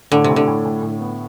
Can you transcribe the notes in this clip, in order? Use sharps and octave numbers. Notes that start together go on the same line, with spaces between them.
A2 D3
C3
A2
D3
A2
A2
A2
B3